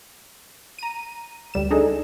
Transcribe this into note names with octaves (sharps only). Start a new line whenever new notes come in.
A#5 D#7
D2 G3 E7
D4 D#4 G#4 A4